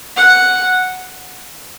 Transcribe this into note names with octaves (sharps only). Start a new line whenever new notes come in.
F#5